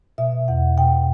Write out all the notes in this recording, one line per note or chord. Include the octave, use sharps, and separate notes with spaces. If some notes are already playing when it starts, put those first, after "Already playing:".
B2 E5
E2 F#5
B2 G5